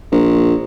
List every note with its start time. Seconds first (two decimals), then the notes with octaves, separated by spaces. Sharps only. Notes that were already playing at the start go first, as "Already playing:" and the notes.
0.12 A#1